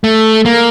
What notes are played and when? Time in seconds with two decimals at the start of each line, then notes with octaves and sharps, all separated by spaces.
0.04 A3
0.45 A#3